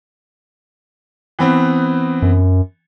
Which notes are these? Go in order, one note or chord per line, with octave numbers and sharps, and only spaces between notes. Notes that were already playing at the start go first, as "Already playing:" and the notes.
E3 B3 C4
F#2